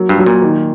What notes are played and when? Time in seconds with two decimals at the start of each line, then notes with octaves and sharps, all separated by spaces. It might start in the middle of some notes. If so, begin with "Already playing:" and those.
Already playing: F#3 A#3
0.09 G2
0.18 F#3
0.26 A#2
0.42 D#3